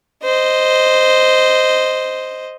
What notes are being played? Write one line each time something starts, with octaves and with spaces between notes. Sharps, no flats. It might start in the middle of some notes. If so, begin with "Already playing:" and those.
C5 D#5